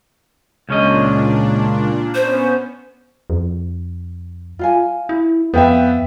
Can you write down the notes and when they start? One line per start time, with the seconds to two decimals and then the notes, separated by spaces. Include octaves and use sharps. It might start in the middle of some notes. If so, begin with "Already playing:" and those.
0.69 C#2 A#2 C#4 D4 D#5
2.15 B3 C#4 C5
3.30 F2
4.59 F4 F5 G#5
5.09 E4
5.54 F2 B3 B4 C5 E5 F5 G5